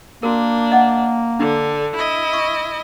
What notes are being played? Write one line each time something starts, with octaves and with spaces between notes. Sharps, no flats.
A#3 D4 F#4 A#4
D#5 F#5 D6
D3 D4
E4 D#5
C#6